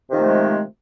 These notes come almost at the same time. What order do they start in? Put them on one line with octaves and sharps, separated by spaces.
C3 D#3 F3 A3 G#3